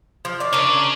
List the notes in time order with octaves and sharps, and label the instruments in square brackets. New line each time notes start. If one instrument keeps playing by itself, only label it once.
[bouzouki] F3
D#3 D5
[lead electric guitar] C#3 [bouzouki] D4 A#4 D5